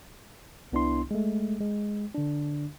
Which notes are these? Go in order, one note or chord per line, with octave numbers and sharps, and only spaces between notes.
C2 B3 D4 E4 C6
G#3 A3
G#3
D3 D4